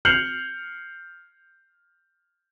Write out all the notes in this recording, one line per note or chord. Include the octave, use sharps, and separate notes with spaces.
F6 G6 C7 C#7 F7 F#7